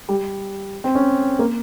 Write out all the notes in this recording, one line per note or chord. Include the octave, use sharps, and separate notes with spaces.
G3
C4
C#4
A#3